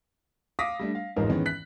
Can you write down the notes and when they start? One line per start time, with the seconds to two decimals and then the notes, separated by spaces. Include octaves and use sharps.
0.59 F5 D6 D#6 A#6 B6
0.79 G3 A3 D4
0.95 F5
1.16 A1 F2 G#2 D#4 A#4
1.30 D#3 E3 G#3 B3 C#4
1.46 F#6 B6